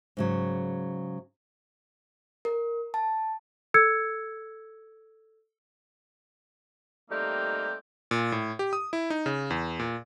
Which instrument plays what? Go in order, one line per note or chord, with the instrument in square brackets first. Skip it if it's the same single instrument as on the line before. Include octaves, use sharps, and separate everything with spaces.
[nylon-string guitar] G#2 C#3 F#3
[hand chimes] A#4
A5
[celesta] A4 E6 G#6 C#7
[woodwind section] G3 A3 A#3 C4 D#4 G4
[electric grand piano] A#2
A2
G4
D#6
E4
D#4
C#3
E2
A#2